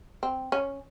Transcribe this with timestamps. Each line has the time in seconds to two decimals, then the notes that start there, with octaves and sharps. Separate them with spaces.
0.23 C4
0.52 C#4